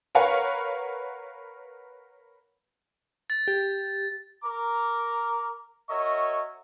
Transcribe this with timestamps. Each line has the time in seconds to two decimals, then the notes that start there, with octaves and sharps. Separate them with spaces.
0.15 A#4 B4 C#5 F5 F#5
3.30 A6
3.48 G4
4.45 A#4 A#5 D6
5.89 F#4 A#4 C#5 D#5 E5 C#6